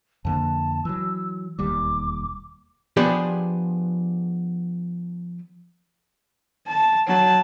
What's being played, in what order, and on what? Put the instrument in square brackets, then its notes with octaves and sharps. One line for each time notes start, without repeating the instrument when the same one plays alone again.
[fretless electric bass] F2 D3 A#3 [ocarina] A5
[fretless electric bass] E3 F#3 [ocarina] E6
[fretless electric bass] E1 D#2 G3 [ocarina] D6
[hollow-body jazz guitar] F3 B3 D4 F4 G4 G#4
[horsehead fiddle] A5
F#3 A5